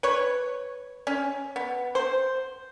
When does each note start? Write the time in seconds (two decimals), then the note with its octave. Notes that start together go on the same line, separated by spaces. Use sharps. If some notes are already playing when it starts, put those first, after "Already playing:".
0.03 B4 C#5
1.07 C#4
1.56 B3
1.95 C5